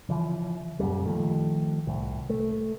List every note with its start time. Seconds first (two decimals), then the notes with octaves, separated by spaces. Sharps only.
0.09 C#3 E3 F3
0.79 F#2 A#2 C#3 G3
1.06 D#3 F3 A3
1.87 C2 A2
2.30 A3